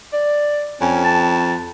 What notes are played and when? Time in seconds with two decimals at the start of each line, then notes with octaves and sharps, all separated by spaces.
0.13 D5
0.81 F2 C#4
1.04 A5